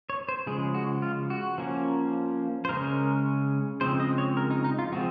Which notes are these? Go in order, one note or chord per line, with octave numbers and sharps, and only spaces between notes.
C#5
C5
C#3 F3 G#3 G#4
F#4
F4
F#4
F3 A#3 C#4
C5
C#3 G#3 C#4 A#4
C#3 F3 G#3 C4 C5
D#5
C#5
A#4
D#4
D#4
F4
F3 G#3 C4 F#4